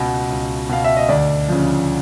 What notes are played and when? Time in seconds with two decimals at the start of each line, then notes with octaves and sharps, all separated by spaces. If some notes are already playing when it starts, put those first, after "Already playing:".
Already playing: C#2 B2
0.30 C#2
0.69 B2 F5
0.84 E5
0.97 D#5
1.09 D2 D5
1.48 C#3 F3